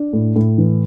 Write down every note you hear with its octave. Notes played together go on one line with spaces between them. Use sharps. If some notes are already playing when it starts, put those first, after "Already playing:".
Already playing: D4
A2
A2
E3